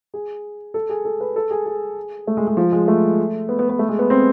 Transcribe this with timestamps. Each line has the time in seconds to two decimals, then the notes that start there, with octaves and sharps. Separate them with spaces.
0.14 G#4
0.74 A4
0.89 G#4
1.05 A4
1.20 B4
1.36 A4
1.51 G#4
1.66 G#4
2.27 A3
2.37 G#3
2.47 G#3
2.57 F3
2.72 G#3
2.88 A3
3.49 B3
3.59 B3
3.69 B3
3.79 A3
3.89 G#3
3.99 B3
4.10 C4